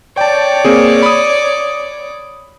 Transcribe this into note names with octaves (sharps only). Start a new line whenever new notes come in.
C#5 D5 G5 A5
A#3 C4 G#4
B5 D#6